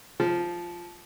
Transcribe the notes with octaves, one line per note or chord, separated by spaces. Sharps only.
F3